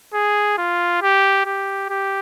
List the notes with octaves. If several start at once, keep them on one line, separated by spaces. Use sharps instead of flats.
G#4
F4
G4
G4
G4